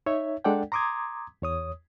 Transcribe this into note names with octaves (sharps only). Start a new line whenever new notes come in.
D#4 C#5 E5
G#3 D4 A4 D5 F#5 G5
A#5 C6 D6 D#6 G#6
E2 C#5 D#6